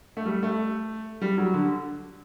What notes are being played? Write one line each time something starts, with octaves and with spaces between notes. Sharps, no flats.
A3
G3
A3
G3
F#3
D3